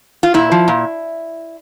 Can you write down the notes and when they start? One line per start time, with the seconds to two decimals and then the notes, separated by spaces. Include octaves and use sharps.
0.23 F4
0.34 A#2 E4
0.52 F3
0.68 A#2